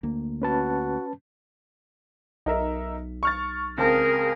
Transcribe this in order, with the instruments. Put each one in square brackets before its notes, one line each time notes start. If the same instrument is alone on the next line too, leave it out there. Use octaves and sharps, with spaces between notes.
[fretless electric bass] D2 A#3
[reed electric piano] C#4 B4 A5 [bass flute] F#4
[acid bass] B1 [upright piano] D#4 A#4 E5
[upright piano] C#6 F6 A6
[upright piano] C#2 C4 A5 [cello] G#4 A#4